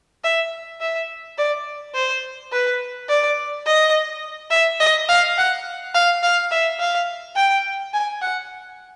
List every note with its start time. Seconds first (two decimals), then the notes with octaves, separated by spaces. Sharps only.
0.24 E5
0.81 E5
1.38 D5
1.95 C5
2.52 B4
3.09 D5
3.67 D#5
4.51 E5
4.80 D#5
5.09 F5
5.38 F#5
5.95 F5
6.23 F5
6.51 E5
6.80 F5
7.36 G5
7.94 G#5
8.22 F#5